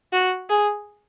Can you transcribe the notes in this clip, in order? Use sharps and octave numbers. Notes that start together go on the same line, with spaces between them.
F#4
G#4